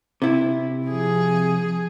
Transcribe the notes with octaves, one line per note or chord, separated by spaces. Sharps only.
C3 E4
F3 G#4